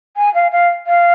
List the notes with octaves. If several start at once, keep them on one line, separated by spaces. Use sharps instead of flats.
G#5
F5
F5
F5